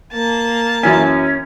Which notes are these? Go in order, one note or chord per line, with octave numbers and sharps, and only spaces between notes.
A#3 A5
F#2 E3 C#4 G#5